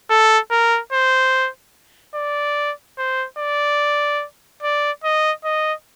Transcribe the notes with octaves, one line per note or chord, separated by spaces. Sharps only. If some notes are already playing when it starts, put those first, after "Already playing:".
A4
A#4
C5
D5
C5
D5
D5
D#5
D#5